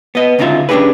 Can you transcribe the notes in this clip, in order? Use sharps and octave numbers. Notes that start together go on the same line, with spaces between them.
B3 D#5
D2 C#3 D#4 F4 E5
C#4 D4 F4 G4 G#4 B4